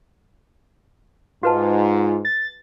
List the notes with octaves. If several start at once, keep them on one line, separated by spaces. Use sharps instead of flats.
G#2 F4 F#4 B4 A5
A6